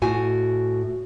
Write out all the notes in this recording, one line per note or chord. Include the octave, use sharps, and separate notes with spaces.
A2 F#4 G#5